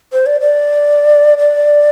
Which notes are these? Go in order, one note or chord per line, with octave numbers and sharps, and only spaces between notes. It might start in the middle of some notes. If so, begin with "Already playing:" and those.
C5
D5
D5
D5